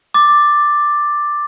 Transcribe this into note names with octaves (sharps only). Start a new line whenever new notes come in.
D6 A6